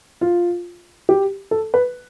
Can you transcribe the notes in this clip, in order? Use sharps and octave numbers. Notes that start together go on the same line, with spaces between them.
F4
G4
A4
B4